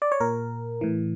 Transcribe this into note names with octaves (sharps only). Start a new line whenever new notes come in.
D5
C#5
A#2 A#4
A2 E3